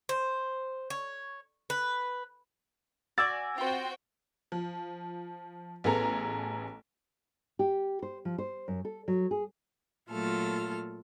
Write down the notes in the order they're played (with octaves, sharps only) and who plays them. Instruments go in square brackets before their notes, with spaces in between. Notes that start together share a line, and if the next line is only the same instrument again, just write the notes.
[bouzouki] C5
C#5
B4
[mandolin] F#4 D5 G#5 [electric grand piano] E6 A6
[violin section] C4 F#4 G5 [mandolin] F4 C5
[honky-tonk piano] F3
A1 B3 G#4 A4 A#5
[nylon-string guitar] G4
C5
F3
C5
F#2
A4
F#3
G#4
[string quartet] A#2 F#3 A3 F4 A4 F6